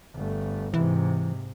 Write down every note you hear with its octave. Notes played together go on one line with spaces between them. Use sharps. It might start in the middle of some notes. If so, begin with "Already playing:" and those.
G1 A3
G#2 C3 E3